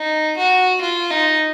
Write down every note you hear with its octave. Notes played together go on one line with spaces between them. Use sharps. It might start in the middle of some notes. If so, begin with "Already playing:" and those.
Already playing: D#4
F#4
F4
D#4